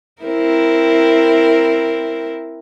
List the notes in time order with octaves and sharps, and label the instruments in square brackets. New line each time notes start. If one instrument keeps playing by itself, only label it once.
[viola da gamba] C4 E4 A#4